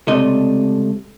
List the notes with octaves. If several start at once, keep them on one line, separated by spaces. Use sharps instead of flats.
C#2 C3 A3 D4 D#5